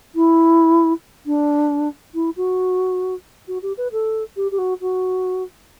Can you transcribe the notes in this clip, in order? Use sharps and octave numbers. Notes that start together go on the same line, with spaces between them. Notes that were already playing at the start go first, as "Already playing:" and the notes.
E4
D4
E4
F#4
F#4
G4
B4
A4
G4
G4
F#4
F#4